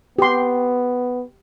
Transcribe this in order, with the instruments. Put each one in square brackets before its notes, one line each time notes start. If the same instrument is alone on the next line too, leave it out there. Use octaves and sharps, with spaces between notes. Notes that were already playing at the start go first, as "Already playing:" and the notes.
[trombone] B3 [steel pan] G4 C6